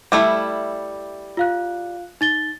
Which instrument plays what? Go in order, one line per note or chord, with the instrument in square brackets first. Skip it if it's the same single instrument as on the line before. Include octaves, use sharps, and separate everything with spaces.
[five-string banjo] G3 A3 E4 [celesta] D6
[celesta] F4 F5 F#6
D#4 A6 G7